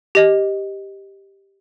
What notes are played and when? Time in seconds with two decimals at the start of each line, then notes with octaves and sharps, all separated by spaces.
0.15 G4 D#5